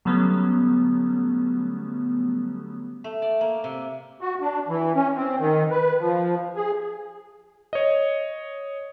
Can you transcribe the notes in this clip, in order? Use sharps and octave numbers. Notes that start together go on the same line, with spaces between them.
D3 F#3 G3 A3 B3 C#4
A3
D5
A#3
C3
F#4
D4
E3
C#4
C4
D#3
B4
F3
G#4
C#5 D#5